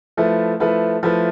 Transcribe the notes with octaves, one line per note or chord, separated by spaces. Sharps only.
F3 A3 E4 B4
F3 A3 E4 B4
F3 A3 E4 B4